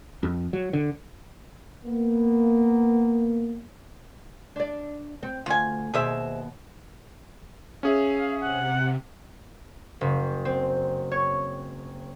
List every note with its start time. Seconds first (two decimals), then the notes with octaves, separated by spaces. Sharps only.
0.23 F2
0.53 F#3
0.73 D3
1.85 A#3 B3
4.56 D4 D5
5.23 C4
5.46 D2 F4 G#5
5.94 D#2 B2 G#4 C5 E5
7.83 C#4 G#4 E5 F5
8.41 C3 F#5
10.01 F#1
10.45 C4
11.11 C#5